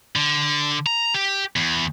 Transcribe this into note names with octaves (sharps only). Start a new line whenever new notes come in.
D3
A#5
G4
E2